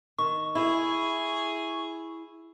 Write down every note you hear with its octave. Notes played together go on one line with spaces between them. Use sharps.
D#3 C#6
E4 G#4